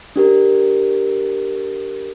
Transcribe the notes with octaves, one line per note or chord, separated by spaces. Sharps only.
D4 G4 A#4